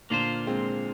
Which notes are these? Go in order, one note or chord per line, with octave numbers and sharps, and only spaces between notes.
A#2 D3 A#3 F4 C5
G#3 C4